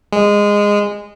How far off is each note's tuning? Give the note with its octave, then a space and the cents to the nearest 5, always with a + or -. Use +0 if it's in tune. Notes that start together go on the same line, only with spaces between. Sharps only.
G#3 -15